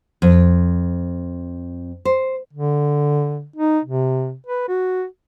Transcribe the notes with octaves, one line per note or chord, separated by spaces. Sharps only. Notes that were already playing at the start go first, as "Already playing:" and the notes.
F2
C5
D3
D#4
C3
B4
F#4